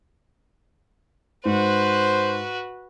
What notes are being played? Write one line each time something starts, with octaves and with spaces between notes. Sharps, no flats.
G#2 F#4 B4 C5